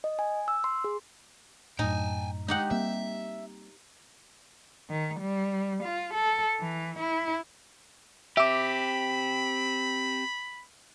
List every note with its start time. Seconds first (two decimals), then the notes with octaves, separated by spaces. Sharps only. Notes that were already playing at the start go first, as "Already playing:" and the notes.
0.04 D#5
0.19 G#5
0.48 E6
0.64 C6
0.84 G#4
1.79 F#2 A2 D#4 G5 G#5
2.48 G#3 D#4 G4 F#5
2.71 G3 A#3 C4 E5
4.90 D#3
5.20 G3
5.84 F4
6.14 A4
6.60 E3
6.99 E4
8.37 C4 G4 E5 B5 D6